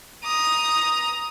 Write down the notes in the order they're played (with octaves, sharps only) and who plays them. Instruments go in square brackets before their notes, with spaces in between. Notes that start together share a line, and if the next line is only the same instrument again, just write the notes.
[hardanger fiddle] A#5 D#6